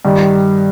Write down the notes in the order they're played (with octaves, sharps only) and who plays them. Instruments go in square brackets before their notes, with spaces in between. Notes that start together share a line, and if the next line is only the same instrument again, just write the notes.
[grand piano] G2 D#3 G3